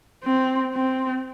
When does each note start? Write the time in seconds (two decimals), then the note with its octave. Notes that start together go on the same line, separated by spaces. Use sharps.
0.24 C4
0.74 C4